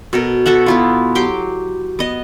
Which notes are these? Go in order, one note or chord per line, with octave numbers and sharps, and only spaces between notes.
B2 A4 A#4
F#4 A4 E5 F#5
B3 E4 F4
F#3 G4 C6 D6
B3 D#5